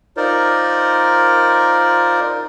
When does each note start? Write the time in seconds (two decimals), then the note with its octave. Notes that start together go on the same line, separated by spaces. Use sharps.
0.17 D#4 F4 A#4 C5 D5